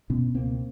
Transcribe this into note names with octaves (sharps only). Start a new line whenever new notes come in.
B2 B3 C#4
C#2 A#3 C4